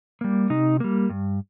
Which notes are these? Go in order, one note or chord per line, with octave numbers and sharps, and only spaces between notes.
G3 A#3
C3 D#4
G3 A#3
G2